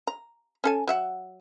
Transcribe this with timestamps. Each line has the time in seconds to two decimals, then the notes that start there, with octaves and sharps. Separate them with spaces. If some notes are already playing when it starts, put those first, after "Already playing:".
0.07 A#5
0.64 C#4 A4 G#5
0.87 F#3 E5 F#5